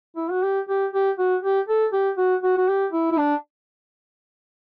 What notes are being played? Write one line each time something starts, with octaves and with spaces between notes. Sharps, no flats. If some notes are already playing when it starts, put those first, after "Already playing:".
E4
F#4
G4
G4
G4
F#4
G4
A4
G4
F#4
F#4
F#4
G4
E4
E4
D4